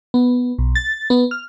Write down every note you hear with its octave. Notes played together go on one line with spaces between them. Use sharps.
B3
B1
A6
B3
F6